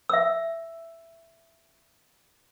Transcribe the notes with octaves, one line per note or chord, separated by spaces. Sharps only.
E5 E6